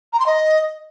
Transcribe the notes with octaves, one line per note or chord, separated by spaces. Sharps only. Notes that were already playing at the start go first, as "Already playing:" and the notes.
A#5
C6
D#5